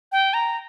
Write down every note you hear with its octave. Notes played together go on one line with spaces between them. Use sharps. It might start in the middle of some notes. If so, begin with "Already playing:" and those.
G5
A#5